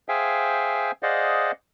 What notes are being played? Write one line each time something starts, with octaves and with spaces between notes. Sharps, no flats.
G#4 C5 E5 F5 G5 G#5
G#4 C5 D5 D#5 F5 F#5